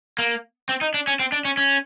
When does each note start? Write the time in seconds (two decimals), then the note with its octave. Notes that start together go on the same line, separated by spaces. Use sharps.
0.19 A#3
0.69 C4
0.81 D#4
0.94 D4
1.07 C#4
1.19 C4
1.32 D4
1.45 C#4
1.57 C#4